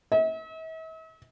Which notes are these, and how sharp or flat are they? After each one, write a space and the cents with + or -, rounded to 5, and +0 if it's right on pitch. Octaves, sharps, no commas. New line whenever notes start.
E5 -45